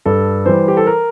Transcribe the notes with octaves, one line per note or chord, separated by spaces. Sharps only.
G2 A4
E3 G3 C5
G4
A4
A#4